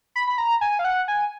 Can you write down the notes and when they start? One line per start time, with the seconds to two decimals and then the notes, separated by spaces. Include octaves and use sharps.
0.16 B5
0.27 B5
0.38 A#5
0.61 G#5
0.79 F5
0.85 F#5
1.08 G#5